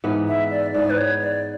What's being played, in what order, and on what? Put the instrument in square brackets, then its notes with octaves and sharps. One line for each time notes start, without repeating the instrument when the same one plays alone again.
[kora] G#2 E3 B3
[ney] E5
D5
[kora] G#2 E3 B3 [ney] D5
[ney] B4
C#5
D5